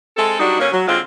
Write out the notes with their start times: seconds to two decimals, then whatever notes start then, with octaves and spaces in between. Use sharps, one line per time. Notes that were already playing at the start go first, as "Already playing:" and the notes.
0.17 G#3 C4 A4
0.40 F#3 G3 D4 D#4 F#4
0.60 D3 A#3 C#4
0.72 F#3
0.87 D3 G#3 C4 F4